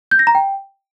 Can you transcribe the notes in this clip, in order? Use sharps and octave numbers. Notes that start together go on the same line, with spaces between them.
G6
A#6
A#5
G5